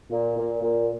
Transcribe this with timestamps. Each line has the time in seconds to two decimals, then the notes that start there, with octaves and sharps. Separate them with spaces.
0.11 A#2
0.37 A#2
0.62 A#2